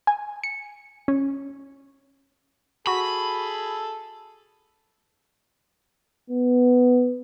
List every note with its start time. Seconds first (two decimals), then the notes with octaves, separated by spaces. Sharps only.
0.07 G#5
0.44 C#7
1.08 C#4
2.87 F#4 G#4 A4 B5
6.30 B3